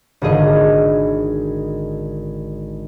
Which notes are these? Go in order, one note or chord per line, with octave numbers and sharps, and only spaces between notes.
G#1 D3 G#4 D#5